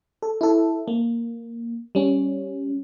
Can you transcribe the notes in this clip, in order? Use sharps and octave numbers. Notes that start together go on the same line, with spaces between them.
A4
E4 A4
A#3
G3 C#4